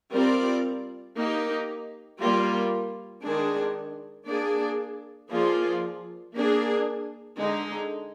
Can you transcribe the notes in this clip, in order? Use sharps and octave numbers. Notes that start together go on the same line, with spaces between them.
G3 C4 F4 A#4 D5
A#3 D#4 G4
G3 A#3 F4
D#3 G#3 D4 G#4
A#3 D4 G#4 D5
F3 A#3 F4 G#4 D5
A#3 D4 G#4
D3 G#3 D#4